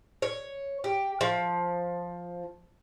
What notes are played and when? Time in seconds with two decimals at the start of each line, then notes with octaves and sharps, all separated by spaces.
0.22 C#5
0.84 G4
1.21 F3